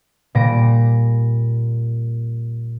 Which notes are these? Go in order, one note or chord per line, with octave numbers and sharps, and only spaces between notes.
A#2 G3 A#6 D7